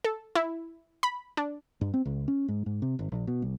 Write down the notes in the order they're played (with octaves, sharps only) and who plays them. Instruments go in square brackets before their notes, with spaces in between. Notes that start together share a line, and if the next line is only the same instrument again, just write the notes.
[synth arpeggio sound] A4
E4
B5
D4
[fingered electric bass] G2
C4
C#2
C#4
G#2
G#2
C3
G#1
A#1
B2
C2